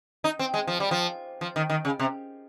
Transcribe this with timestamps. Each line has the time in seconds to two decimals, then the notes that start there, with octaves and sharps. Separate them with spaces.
0.24 D#4
0.39 C4
0.54 G#3
0.67 F3
0.80 G3
0.91 F3
1.41 F3
1.56 D#3
1.70 D#3
1.85 C#3
1.99 C3